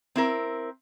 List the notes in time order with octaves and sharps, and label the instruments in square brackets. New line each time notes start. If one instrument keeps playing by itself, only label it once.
[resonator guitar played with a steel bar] C4 E4 A#4